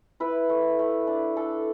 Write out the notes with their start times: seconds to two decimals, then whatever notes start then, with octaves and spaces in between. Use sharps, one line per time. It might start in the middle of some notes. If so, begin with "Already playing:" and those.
0.20 E4 B4
0.49 A3
0.79 A3
1.07 D4
1.37 D4 A4